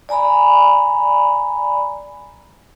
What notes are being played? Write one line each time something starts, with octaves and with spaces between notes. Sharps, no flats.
D5 G#5 A#5 B5